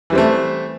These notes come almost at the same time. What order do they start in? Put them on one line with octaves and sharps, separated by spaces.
E3 G3 C4 A3